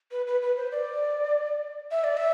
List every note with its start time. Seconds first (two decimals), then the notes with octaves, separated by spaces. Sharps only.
0.12 B4
0.27 B4
0.42 B4
0.57 C5
0.72 D5
1.91 E5
2.04 D5
2.17 E5